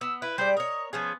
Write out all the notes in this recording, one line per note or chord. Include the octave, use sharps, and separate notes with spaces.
B3 E6
E4 B4
G3 G#3 C5 D5
A#4 C#5 D#5
F3 B3 C#4 G#4